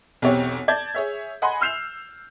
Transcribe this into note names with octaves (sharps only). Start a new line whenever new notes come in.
B1 E2 C4 G4 C#5
D5 A5 G6 G#6
G#4 C#5 E5
D#5 F#5 G#5 B5 C6
E6 F6 G6 C7 E7 F7